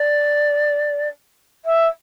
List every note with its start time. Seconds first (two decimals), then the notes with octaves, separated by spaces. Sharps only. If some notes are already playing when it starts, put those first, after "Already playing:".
Already playing: D5
1.65 E5